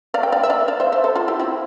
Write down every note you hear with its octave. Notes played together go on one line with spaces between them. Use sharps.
D5 F5
G5
D5 F5
E5
D5 F5
D5 F5
C5 E5
C5 E5
A4 C5
F4 A4
E4 G4
C4 E4